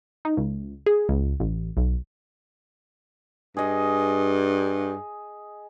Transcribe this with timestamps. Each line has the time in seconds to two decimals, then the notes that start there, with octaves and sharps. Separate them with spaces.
0.25 D#4
0.37 C#2
0.86 G#4
1.09 C#2
1.40 A1
1.77 B1
3.57 G2 G#4 D#5